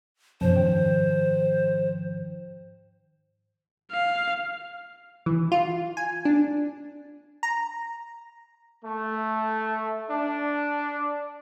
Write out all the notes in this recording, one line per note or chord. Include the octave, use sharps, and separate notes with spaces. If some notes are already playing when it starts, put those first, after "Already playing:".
F#2 B2 F3 C#4 C5
G#2 D#3 G5
F5
E3
F4
G#5
D4
A#5
A3
D4